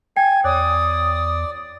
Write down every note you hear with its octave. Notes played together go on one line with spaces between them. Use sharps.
G5 G#5
E2 C#5 D5 D#6